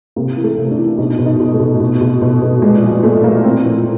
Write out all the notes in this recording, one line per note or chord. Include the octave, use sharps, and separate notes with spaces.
C3 A#3
E3
A3
C3
D4
E3
B2 D#4
B2
D#4
B2
A3
B2
B2
B2
B2
B2
A#2 G#3
F3 G#3
A#2 A3
F3 A#3
A2 C4
F3